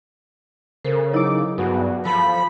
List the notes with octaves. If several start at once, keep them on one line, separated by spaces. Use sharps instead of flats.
C#3 A4 A#4 C5
F#3 D#4 E4 D6
G2 B3 F#4 G#4
F3 A4 B5